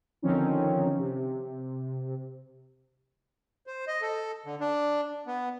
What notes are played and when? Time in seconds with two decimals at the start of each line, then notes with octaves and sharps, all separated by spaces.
0.22 D3 D#3 F3 C4 C#4 D#4
0.99 C3
3.67 C5
3.88 D#5
4.02 A4
4.46 D3
4.60 D4
5.27 B3